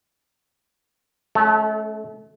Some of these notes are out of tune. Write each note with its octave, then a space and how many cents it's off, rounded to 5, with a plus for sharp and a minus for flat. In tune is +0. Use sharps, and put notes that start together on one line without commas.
A3 -35 C#4 +0 A4 +0